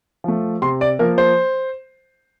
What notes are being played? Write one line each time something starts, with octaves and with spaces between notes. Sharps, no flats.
F3 A3
C3 C6
D5
F3 A#3 A#4
C5